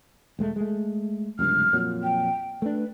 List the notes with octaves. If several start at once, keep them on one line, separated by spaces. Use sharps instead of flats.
E1 G#3 A3
G#3 A3
F1 C#2 G2 F6
F2 A#2 F#3
G5
A3 D4 B4